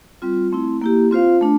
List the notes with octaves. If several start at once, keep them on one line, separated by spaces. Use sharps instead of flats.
G3 C4 F4
A3 C4 E4
A#3 E4 G4
C4 F4 C5 F5
A3 D4